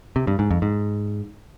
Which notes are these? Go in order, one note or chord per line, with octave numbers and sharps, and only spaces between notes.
C3
G2
G#2
F2
G#2